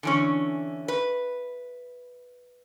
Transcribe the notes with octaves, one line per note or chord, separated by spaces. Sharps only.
D3 E3 C#4
B4